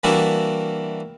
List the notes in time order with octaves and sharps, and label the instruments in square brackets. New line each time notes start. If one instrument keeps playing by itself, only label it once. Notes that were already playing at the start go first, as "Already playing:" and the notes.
[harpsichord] E3 G3 A#3 D4 E4 F#4